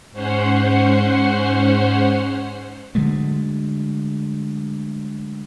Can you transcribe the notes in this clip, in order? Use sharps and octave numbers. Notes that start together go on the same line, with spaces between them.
G#2 C#4 C5 C#5 F#5 C7
D3 F#3 G#3 A3